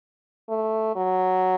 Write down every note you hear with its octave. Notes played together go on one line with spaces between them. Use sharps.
A3
F#3